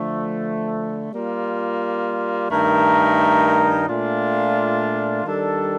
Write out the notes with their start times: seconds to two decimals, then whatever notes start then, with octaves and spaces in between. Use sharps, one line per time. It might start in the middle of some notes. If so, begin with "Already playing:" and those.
Already playing: D3 F3 A3
1.13 G3 A#3 F4
2.50 G2 D#3 A3 D#4 A#4
3.88 A#2 A3 D4 F4
5.24 D#3 G3 D4 A4